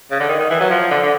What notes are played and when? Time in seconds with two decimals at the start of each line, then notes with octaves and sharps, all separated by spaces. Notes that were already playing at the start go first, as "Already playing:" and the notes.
0.11 C#3
0.20 D3
0.29 D#3
0.39 D#3
0.50 E3
0.60 F#3
0.70 F3
0.91 D3
1.03 D3